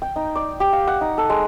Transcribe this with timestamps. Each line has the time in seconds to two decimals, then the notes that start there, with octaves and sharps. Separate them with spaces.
0.02 G5
0.16 D#4
0.36 D5
0.60 G4
0.73 F5
0.87 F#5
1.01 D#4
1.18 A4
1.30 G#3